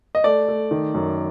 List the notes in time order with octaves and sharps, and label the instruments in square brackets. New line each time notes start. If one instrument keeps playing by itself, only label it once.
[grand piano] D#5
A3 D5
A3
D#3
F#2